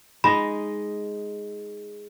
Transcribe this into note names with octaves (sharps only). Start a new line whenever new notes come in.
G#3 D#4 B5